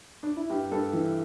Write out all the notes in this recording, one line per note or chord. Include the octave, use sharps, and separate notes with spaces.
D4
E4
G2 G4
G2 A4
E3